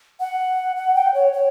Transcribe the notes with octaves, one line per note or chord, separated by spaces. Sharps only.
F#5
F#5
G5
C#5
C#5